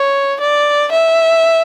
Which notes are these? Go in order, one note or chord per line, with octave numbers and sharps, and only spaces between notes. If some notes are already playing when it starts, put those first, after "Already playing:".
Already playing: C#5
D5
E5